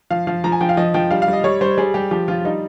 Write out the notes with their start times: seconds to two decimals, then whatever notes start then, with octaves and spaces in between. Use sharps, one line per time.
0.10 F3 F5
0.27 F3 F5
0.44 F3 A#5
0.52 G#5
0.61 F3 G5
0.69 F5
0.77 F3 D#5
0.94 F3 G5
1.11 G3 F5
1.22 F5
1.28 G3
1.33 D#5
1.44 G3 C#5
1.61 G3 C5
1.78 G3 G#4
1.94 G3 G4
2.11 F3 G4
2.28 F3 F4
2.45 G3 D#4